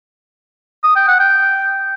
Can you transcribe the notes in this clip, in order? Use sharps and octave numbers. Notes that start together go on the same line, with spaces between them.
D#6
G5
F#5
G5